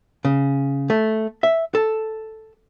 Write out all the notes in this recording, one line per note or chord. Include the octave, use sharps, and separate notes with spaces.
C#3
A3
E5
A4